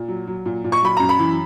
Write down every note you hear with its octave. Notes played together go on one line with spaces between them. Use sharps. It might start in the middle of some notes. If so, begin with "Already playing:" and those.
Already playing: A#2
F#3
F#3
A#2
A#2
C#6
F#3 B5
F#2 A#5
B5
E3